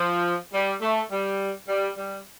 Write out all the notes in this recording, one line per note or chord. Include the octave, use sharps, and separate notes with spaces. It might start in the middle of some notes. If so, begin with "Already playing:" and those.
Already playing: F3
G3
A3
G3
G3
G3